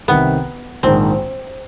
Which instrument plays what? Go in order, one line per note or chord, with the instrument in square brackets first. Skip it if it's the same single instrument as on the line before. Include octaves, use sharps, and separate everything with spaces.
[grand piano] C2 C3 D#3 [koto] B3
[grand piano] A#1 G#2 D#3 [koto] C4